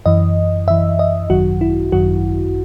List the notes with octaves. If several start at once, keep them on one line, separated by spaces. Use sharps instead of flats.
F#2 E3 D#5
F#2 E3 E5
D#5
G#1 F#2 D#3 F#3 F#4
E4
G#1 F#2 D#3 F#3 F#4